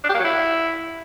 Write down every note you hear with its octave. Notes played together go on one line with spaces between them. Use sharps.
D4
G4
A#3
F#3
E4